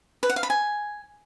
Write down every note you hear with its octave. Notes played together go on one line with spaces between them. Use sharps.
B4
F#5
F5
B5
G#5